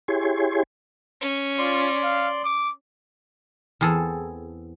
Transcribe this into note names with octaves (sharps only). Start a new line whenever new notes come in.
E4 G4 G#4 C#5 G#5 C6
C#4
F4 D5 C6
F5
D6
E2 C4 G#4 A4